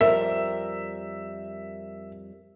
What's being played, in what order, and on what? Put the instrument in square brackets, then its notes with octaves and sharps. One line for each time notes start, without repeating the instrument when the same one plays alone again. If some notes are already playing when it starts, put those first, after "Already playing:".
[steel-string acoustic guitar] F2 G3 A#4 [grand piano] E5